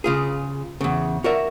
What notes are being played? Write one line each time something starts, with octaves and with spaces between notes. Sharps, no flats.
C#3 F4 G#4
E2 C#3
F#4 A#4 D5 E5